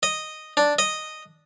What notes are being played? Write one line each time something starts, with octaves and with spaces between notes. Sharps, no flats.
D#5
D4
D#5